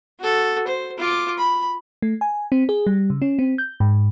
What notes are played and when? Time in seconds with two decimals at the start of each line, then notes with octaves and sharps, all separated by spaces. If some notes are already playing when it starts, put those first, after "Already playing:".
0.20 F#4 A4
0.67 C5
0.98 F4 D6
1.38 B5
2.02 A3
2.21 G#5
2.52 C4
2.69 G#4
2.87 G3
3.10 C#3
3.22 C#4
3.39 C4
3.58 G6
3.80 G#2